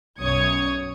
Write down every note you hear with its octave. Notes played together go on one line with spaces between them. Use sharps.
B1 F#2 C#5 D#6 G#6 C#7